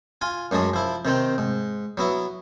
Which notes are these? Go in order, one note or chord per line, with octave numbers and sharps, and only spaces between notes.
F4 G#5
F#2 F#3 G#3 G#4 A5
F3 E4
C3 D#3 C4
G#2
F#3 B3 E4